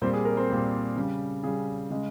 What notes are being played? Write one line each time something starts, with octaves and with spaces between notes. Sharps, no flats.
A#2 G3 C4 C5
G#4
A#4
C4 C5
A#2 G3
C#3 G3
C#3 G3 G#4
C#3 G#3